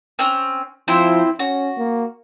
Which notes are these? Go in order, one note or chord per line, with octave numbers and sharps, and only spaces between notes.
C4 C#4
F3 C4 E4 C5
C#4 F#4
A#3